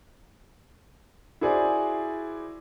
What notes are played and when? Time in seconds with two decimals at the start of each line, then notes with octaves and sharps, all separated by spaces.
1.41 E4 F#4 G#4 C5 D5